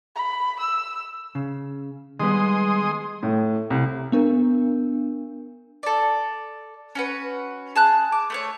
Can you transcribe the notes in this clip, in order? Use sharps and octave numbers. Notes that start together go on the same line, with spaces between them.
B5
E6
C#3
D#3 G3 G#3 B3 C6 D#6
A2
C2
B3 D4 A#4
A4 D5
C#4 F#4 B4
G#4 A5 F#6
D6
A3 C5 C#5